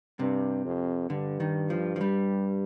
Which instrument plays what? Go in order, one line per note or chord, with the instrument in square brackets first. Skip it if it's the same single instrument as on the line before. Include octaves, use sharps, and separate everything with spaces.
[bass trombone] G2 [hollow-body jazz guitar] C3
[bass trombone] F2
[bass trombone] G2 [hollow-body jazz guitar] D3
[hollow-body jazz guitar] D#3
F3
F3
G3